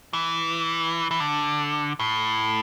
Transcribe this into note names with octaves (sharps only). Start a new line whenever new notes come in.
E3
E3
D3
A2